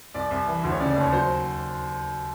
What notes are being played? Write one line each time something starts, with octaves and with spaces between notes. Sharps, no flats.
C2 D5
C2
E3
D2
C#5
C#3 D5
D5
D#2 C#5
F#3 C5